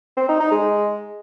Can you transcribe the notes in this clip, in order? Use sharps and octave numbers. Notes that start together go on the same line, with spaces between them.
C4
D#4
D#4
G#3